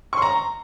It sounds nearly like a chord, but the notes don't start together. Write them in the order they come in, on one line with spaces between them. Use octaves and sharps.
C#6 C6 A#5